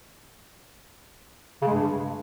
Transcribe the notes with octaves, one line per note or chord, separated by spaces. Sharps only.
C#3
G#3
G2